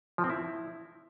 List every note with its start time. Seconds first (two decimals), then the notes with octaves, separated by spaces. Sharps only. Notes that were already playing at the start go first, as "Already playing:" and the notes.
0.18 F3
0.24 C4
0.30 E4